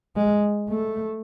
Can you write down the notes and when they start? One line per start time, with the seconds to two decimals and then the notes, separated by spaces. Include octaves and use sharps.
0.16 G#3
0.69 A3